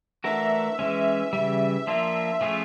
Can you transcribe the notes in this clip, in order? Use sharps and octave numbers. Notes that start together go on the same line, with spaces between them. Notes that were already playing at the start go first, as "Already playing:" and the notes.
E3 A3 D4 F#4 A#4 E5
E3 G#3 C#4
C#3 E3 G3 E5
F3 A#3 D4 F4
F3 A3 C#4 F4 G#4